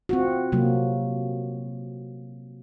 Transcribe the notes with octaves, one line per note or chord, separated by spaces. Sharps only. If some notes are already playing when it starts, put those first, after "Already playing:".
C4 F4 F#4
C3 F#3 A#3